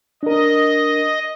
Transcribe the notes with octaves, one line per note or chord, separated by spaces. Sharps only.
D4 A#4 D#5